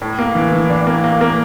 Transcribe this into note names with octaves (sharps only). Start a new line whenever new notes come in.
A2
A#3
E3
E3
D4
A#3
A#3
A#3